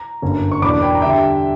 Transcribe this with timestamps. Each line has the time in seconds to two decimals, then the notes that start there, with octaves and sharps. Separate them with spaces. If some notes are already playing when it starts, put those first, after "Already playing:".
Already playing: A#5
0.22 G1 F#2 D3 A#3 C#4
0.51 C#6
0.62 E2 B2 A#3 D4 B5 D6
0.82 G5 B5
0.95 A#5
1.02 D3 G3 E5 G5